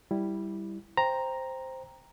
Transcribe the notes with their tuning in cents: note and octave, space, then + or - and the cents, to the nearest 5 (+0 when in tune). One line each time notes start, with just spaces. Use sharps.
G3 +0 E4 -5
C5 +0 G5 +10 A#5 +0